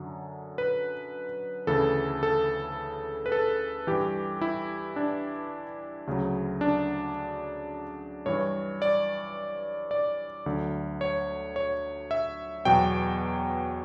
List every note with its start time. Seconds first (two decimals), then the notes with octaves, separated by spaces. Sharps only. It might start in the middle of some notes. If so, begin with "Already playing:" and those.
Already playing: F#2 D3 F#3
0.58 B4
1.67 D2 C#3 E3 A4
2.23 A4
3.26 B4
3.32 A4
3.87 G2 E3 G4
4.41 E4
4.96 D4
6.07 D2 C#3 F#3
6.61 D4
8.26 G2 E3 C#5
8.82 D5
9.91 D5
10.46 D2 D3 F#3
11.01 C#5
11.56 C#5
12.11 E5
12.65 E2 B2 F#3 G5